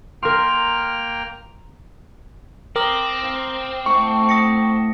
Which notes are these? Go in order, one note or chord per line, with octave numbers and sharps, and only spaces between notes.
A#3 A#4 G5 C6 F6
C4 A#4 D6 D#6 F#7
F5
A2 A3 F#5 C#6
D#6 A#6 C#7